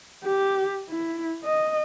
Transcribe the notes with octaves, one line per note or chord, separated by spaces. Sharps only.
G4
E4
D#5